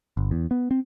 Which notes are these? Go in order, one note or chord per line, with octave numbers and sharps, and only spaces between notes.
G1
E2
B3
C4